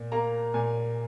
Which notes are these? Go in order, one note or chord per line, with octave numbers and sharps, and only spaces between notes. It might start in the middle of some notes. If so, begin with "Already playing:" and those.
Already playing: A#2
A#3 A#5
A#2 G#5